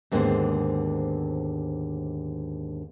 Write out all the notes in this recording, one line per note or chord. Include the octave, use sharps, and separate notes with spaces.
D#2 G#2 D3 B3 C4